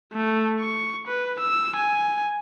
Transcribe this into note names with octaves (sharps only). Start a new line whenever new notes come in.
A3
C#6
B4
E6
G#5